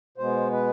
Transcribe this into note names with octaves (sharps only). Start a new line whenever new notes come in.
B2 G#3 B3 C5
B4